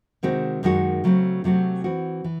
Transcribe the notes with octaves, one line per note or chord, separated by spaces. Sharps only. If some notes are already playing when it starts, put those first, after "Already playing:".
C3 D#3 G#3 C4 F#4
F#2 D#3 G#3 D#4 F#4
C#3 F#3 A3 C4
C3 F#3 A3 C4 F#4
E3 C4 F#4
E3